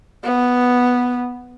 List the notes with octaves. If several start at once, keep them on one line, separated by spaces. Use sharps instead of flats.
B3